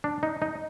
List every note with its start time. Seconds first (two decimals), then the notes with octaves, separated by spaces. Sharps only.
0.04 D4
0.23 D#4
0.42 D#4